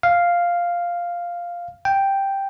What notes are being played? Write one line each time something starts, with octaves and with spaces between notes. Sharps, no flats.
F5
G5